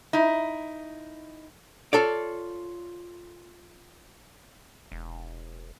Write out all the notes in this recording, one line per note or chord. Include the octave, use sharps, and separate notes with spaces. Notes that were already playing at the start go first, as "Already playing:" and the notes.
D#4 E4
F4 A4 C#5 D5
E1